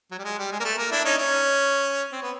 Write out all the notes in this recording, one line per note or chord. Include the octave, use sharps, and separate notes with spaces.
F#3
G3
G#3
G3
G#3
A#3
A3
A#3
D4 E4
C#4 D#4
C#4
C4
B3